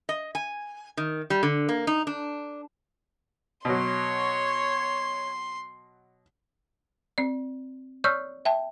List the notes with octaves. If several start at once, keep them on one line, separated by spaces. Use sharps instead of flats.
D#5
G#5
D#3
G3
D3
A#3
D#4
D4
B2 F#3 C#5 C6
C4 D5
C#5 D5 C#6 E6 F6 G6
E5 G5 A5